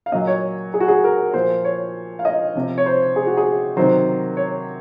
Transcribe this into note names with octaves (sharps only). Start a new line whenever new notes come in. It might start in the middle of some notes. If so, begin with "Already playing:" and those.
F5
A#2 F#3 D#5
C#5
G#4
F#4
G#4
A#4
A#2 F3 C5
C#5
F5
D#5
C3 F3
C#5
C5
G#4
F#4
G#4
C3 D#3 F#3 C5
C#5